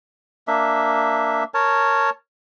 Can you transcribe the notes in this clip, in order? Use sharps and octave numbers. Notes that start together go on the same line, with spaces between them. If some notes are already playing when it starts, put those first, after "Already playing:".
A#3 D4 E5
A#4 C#5 A5